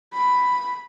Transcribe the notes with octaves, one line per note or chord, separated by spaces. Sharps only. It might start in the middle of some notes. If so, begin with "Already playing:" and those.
B5